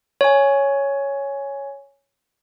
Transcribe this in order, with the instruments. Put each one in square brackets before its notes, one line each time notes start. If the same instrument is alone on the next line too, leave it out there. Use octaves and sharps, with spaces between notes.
[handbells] C#5 G#5